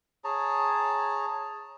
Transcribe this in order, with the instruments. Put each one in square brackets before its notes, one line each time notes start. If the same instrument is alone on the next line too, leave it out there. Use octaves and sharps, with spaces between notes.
[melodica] G#4 C#5 A5 A#5